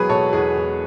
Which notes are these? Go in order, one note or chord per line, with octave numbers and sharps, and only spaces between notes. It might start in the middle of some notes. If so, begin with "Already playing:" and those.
Already playing: E1 F#3 G#4 B4
B2 A4 C#5
E2 G#4
E2